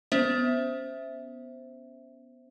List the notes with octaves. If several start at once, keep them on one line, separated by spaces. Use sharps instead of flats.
B3 C#4 C5 E5